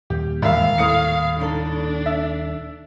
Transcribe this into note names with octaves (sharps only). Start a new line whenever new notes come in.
D#2 A#2 G3 G4
E1 G#3 E5 F5
A2 A#3 F#5 D#6 C#7
C#3 D4 D#4 A4
E5